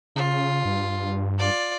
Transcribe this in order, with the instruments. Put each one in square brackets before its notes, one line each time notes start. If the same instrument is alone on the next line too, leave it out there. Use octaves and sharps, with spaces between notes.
[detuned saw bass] C#3 [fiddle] F4
[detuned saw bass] G2
[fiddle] F4 D5